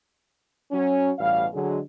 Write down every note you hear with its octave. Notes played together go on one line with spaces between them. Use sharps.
F#3 C#4
A1 B2 G3 F5
D3 F#3 G#3